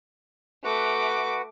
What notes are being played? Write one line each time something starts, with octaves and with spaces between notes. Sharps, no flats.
A3 F#4 B4 F#5 D6